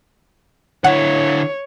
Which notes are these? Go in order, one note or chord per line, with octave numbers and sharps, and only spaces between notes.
D3 E4 C#5 F#5